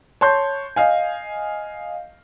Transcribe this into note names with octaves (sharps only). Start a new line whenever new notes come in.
C#5 A5 C6 G6
D#5 F5 G#5